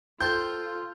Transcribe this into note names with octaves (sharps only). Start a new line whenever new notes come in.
F4 A4 C5 G5 G6